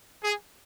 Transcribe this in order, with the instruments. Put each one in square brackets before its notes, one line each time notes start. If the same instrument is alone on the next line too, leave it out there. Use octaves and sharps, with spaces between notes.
[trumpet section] G#4